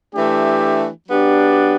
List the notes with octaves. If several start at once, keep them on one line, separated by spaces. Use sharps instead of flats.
E3 A3 D4 G4
F#3 B3 D4 G4